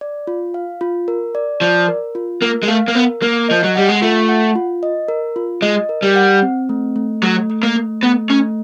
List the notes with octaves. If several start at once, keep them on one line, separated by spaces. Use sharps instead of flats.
D5
F4
F5
F4
A#4
D5
F3 D5
A#4
F4
A#3 A#4
G#3
A3 F5
A#3
B3 A#4
A#3 A#4
F3 D#5
F#3
G3 F#5
G#3
A3 F4
F#5
F4
D#5
A#4
F4
G#3 D#5
A#4
G3
F#5
C4
A3
A3
F#3 A3
A3
A#3
A3
A3 B3
A3 C#4